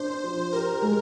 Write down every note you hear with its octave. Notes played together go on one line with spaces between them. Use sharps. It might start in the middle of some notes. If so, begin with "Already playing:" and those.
Already playing: D4 C5
F3
G4 A#4
G#3